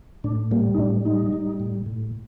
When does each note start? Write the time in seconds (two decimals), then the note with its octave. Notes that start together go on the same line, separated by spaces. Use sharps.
0.24 A2 D4
0.51 G3 A#3
0.74 D#4
0.78 A2 D4
1.05 G3 D#4
1.33 G3
1.60 A2
1.86 A2